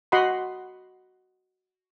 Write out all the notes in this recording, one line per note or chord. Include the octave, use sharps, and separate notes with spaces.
F#4 D#5 F#5 B5 C6